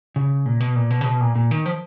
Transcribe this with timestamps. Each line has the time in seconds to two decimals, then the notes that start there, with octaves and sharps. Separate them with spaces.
0.16 C#3
0.46 A#2
0.60 B2
0.76 A#2
0.90 B2
1.01 C#3
1.05 B2
1.21 A#2
1.36 A#2
1.51 D#3
1.66 F3